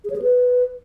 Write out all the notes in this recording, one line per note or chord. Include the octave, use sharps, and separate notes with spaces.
G#4
C#5
G#4
B4